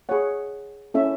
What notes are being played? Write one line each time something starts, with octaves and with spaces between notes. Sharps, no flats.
G#4 C#5 F#5
C#4 E4 A4 E5